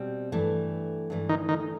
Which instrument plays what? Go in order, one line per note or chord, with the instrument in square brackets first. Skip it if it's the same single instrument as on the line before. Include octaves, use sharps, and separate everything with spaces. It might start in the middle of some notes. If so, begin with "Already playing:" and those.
Already playing: [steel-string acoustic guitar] B2 G3 C4
G2 E3 A3
G2 E3 A3
[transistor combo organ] D#3 D#4
D#3 D#4